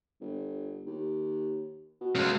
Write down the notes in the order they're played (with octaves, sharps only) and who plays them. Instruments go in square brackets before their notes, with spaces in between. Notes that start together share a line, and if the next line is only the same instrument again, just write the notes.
[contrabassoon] G1
D#2
B2
[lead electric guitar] C#3 G#3